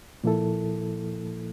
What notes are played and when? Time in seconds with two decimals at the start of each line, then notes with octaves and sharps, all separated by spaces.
0.24 A#2 F3 A#3 E4 A4